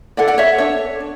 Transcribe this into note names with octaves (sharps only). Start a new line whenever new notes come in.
E4 A4 D5 F#5
D5 F#5
C#5 E5
D4 A4 C#5
D4